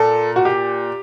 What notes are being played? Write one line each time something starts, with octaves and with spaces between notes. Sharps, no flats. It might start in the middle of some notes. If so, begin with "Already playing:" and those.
Already playing: A#2 A4
F#4
G4